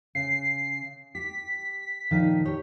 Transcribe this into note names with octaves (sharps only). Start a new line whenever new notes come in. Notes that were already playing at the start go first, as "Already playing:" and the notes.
C#3 C7
G4 B6
A#2 D#3 F3
G4 C#5